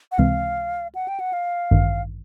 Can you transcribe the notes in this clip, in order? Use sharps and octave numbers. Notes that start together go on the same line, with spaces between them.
F#5
C#2 C3 E3 G#3 C4 F5
F#5
G5
F#5
F5
A1 G2 D#3